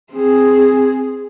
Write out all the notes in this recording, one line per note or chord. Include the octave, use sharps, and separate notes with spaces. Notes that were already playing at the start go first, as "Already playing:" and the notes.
C4 G#4